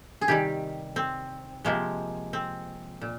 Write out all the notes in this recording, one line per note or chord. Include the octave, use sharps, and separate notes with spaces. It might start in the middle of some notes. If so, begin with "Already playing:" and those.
G#4
C3 D#3 G3 G4
C4
C3 F3 G#3 A#3
C4
A#2